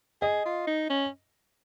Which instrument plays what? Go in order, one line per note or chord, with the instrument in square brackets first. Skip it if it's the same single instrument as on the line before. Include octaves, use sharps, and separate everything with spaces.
[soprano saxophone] G#4 [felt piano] D#5
[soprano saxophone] F4
D#4
C#4